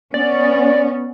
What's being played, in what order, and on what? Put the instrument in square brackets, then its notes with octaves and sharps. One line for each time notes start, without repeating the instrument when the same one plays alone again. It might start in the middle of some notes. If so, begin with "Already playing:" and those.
[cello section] B3 C#4 [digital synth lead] D5